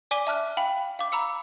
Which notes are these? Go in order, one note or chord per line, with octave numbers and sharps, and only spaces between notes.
D5 G#5 D6 B6 D#7 G7
E5 A5 F6 F#6
F5 G5 B5 F#7
F5 D6
A#5 B5 E6 C#7